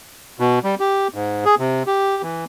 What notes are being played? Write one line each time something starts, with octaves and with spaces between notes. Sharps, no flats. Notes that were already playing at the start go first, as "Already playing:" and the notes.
B2
G3
G4
G#2
G#4
C3
G4
E3